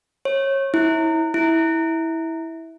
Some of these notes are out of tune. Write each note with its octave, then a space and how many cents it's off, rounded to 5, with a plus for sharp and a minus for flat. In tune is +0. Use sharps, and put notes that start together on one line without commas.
C#5 -25
E4 -25
E4 -15